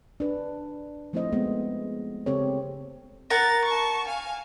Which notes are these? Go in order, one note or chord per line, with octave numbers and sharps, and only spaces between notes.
D4 B4
F3 A3 C4 E4 C5 D#5
G#3 A3 B3 C4
C#3 C4 G4 A4 C#5
A#4 F#5 A#5 A6
A5 C#6
F5 G#5